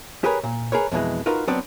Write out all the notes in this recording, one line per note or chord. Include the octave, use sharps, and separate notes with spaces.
G4 G#4 A#4 B4 C#5
A#2
G#4 A#4 B4 C#5
F2 B2 D3 E3 G#3
D#4 F4 F#4 A#4 B4
F#3 B3 C4 D4 D5